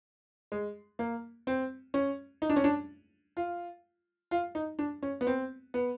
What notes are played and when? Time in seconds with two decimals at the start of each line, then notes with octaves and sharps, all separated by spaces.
0.52 G#3
0.99 A#3
1.47 C4
1.94 C#4
2.42 D#4
2.50 D4
2.56 C#4
2.64 D4
3.37 F4
4.31 F4
4.55 D#4
4.79 D4
5.03 C#4
5.21 B3
5.27 C4
5.74 B3